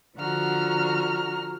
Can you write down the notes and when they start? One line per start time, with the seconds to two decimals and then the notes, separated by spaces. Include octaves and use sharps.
0.16 D3 F3 F#4 A#5 F6